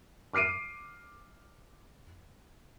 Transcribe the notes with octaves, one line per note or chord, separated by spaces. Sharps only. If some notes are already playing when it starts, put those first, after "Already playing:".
D6 F6 C7 D7 D#7